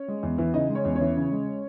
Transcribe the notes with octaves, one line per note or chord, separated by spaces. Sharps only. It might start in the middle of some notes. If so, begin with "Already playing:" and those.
Already playing: C#4 C#5
G#3
E2
E3
C#3 D#4 D#5
G#3
C#4 C#5
E2
C#4 C#5
E3
C#3
G#3